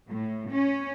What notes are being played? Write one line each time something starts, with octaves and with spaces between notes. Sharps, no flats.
A2
C#4